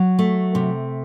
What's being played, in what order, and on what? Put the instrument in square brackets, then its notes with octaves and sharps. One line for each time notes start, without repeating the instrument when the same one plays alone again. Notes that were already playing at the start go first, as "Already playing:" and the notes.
Already playing: [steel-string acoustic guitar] F#3
A3
C3